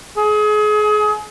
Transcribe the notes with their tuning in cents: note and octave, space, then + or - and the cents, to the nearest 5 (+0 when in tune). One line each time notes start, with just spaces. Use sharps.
G#4 +30